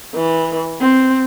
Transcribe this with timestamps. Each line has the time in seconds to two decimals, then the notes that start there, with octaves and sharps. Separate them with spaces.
0.15 E3
0.81 C4